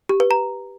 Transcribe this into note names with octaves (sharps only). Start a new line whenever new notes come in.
G4
B4
A#5